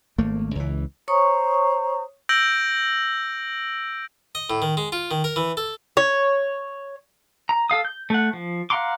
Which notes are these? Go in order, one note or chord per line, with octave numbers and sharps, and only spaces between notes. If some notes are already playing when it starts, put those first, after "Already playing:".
G#1 A3 A#3
C#2 E3
C5 C#5 A#5 C#6 D#6
E6 G6 A#6 D7 F#7
D#5
A2
D#3
G#3
F4
D#3
A#4
E3
A4
C#5
A#5
A4 F5 D#6
G6
A3 F#5
F3
F5 F#5 A#5 C6 D6